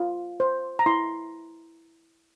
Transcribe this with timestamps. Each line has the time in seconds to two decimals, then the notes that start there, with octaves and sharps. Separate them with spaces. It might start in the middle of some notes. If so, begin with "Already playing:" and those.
Already playing: F4
0.40 C5
0.79 A#5
0.86 E4 C6